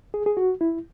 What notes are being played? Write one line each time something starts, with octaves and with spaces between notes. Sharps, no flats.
G#4
G#4
F#4
E4